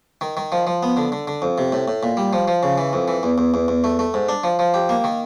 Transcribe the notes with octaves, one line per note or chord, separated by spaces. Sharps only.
D#3
D#3
F3
F3
B3
D3
D3
D3
F2
C3
A2
A2
A#2
G3
F3
F3
C#3
E3
F2
E3
E2
E2
E2
E2
A3
A3
G#2
D4
F3
F3
G4
A#3
D#3